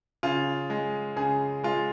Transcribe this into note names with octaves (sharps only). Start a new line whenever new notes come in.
C#3 F4
G#3
C#3 G#4
G#3 F4